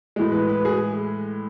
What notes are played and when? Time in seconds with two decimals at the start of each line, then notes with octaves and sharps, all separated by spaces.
0.16 A2 E3 G#3
0.32 B4
0.49 B4
0.65 G#4